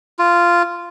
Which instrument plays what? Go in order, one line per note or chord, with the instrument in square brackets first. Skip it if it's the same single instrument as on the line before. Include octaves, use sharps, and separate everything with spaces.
[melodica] F4